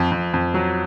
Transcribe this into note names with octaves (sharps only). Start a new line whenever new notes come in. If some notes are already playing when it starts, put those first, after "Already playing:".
Already playing: F2
F2
F2
F#3